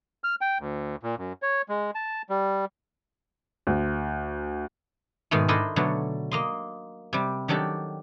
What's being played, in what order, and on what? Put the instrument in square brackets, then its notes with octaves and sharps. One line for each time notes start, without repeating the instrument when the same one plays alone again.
[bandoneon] F6
G5
D2
A#2
F#2
C#5
G#3
A5
G3
[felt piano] D2
[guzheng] G#2 B2 D#3 G#3 A3
D4 E4 A4 A#4 C5 D#5
B2 D3 F#3 A3
A#3 D#5 C6
C3 G3
D#3 F#3 D4 G4 A4